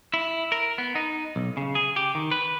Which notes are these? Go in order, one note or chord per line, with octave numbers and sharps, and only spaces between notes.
E4
A#4
B3
D#4
B1
C#3
G#4
G4
D#3
B4